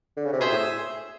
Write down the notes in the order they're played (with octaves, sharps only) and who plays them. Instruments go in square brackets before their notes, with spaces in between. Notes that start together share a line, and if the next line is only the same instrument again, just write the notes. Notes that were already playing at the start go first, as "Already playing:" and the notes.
[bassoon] D3
C#3
C3
[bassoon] B2 [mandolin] G#4 C5 E5
[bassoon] A2